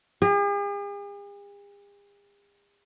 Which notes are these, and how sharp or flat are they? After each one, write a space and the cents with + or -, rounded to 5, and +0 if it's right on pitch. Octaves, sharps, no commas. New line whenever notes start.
G#4 -45